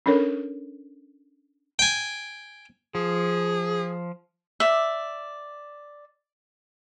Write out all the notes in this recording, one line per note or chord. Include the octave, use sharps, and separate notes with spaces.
C#4 D4 A4 A#4 C#5
G5 G#5
F3 G#4
D5 E5